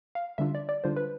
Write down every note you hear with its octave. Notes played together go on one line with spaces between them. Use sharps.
F5
D3 G3 D4 F4 E5
D5
D5
D3 G3 D4 F4 C5
B4